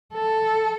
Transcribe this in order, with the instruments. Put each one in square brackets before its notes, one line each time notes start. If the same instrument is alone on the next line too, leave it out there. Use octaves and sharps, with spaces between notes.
[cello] A4